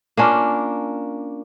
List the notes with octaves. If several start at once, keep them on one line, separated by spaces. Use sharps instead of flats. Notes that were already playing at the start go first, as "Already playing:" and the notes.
A#3 C#4 D4 F4